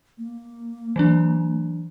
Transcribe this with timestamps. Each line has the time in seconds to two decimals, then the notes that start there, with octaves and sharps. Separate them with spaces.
0.18 A#3
0.96 E3 F#3 D4